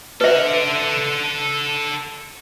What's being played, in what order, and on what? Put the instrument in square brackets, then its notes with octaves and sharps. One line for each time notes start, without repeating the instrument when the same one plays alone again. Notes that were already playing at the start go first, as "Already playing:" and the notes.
[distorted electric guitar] A4 F#5 [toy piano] B4 E5